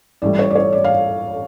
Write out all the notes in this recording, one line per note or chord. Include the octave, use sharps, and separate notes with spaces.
A1 A2 G3 D5
C#5
D5
C#5
D5
F5